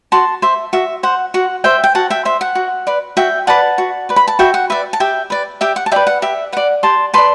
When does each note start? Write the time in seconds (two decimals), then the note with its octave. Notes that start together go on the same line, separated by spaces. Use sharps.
0.12 F#4 A5 C6
0.42 C5 E5
0.73 F#4 E5
1.03 C5 F#5
1.34 F#4 F#5
1.64 C5 E5 G5
1.84 G5
1.95 F#4 F#5 A5
2.10 E5 G5
2.25 C5 E5
2.41 F#5
2.55 F#4
2.87 B4 D5
3.17 F#4 E5 G5
3.47 B4 D5 F#5 A5
3.78 F#4
4.09 B4 D5
4.16 B5
4.28 A5
4.39 F#4 E5 G5
4.54 F#5
4.70 B4 D5 E5
4.93 A5
5.00 G4 E5 G5
5.30 B4 D5
5.61 G4 E5 G5
5.76 F#5
5.86 A5
5.92 B4 D5 E5 G5
6.07 F#5
6.22 G4 E5
6.52 B4 D5 F#5
6.83 G4 A5 C6
7.14 B4 D5 A5 C6